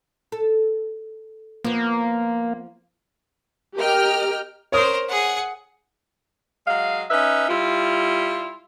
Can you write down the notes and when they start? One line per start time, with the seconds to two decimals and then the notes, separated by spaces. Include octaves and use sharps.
0.32 A4
1.64 F3 A#3 B3
3.76 G4 A#4 D#5 G5 F6
4.72 A#4 C5 C#5 D#6
5.08 G#4 F#5
6.66 F#3 G#3 F5
7.10 C#4 D#4 B4 E5
7.48 G3 E4 F4